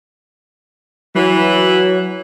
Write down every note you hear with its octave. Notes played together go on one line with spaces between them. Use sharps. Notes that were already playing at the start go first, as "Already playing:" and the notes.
E3 F#3